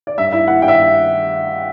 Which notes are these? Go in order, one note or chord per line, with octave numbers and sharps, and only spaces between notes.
D5
G2 E5
E4 E5
E4 F#5
G2 G5
E5